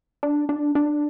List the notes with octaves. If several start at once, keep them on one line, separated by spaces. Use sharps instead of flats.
D4
D4
D4